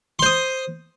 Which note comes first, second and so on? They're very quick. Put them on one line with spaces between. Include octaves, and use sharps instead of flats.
C6 C5 D#6